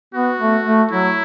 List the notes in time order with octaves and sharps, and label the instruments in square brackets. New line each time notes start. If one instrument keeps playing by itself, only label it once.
[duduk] B3 [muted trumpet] F#4
[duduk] A3
A3
[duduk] F#3 [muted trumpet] E4